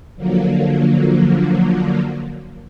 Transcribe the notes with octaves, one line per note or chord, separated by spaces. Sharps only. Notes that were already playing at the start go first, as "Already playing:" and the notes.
D3 F3 F#3 A#3